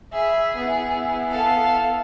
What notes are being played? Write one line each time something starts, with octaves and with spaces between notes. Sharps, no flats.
G#4 E5 B5
B3 E4
A4 F5